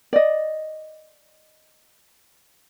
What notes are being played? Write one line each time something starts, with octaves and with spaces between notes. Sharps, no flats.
D5 D#5